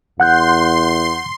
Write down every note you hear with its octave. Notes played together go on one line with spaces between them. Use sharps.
E2 F#5 C6 F#6 G6